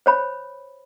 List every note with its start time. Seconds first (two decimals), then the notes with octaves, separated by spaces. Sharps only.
0.06 C5 C#5 B5